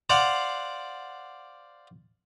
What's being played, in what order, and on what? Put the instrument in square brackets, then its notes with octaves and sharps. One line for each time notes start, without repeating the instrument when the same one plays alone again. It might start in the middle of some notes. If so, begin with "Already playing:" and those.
[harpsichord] C5 D5 F5 F#5